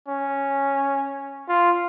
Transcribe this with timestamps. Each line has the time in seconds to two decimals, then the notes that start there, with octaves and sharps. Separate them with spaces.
0.08 C#4
1.49 F4